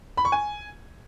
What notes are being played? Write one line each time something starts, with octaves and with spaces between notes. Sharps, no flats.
B5
C#6
G#5